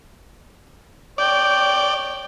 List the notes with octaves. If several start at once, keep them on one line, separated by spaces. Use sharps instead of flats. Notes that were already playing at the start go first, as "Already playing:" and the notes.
C#5 D5 G5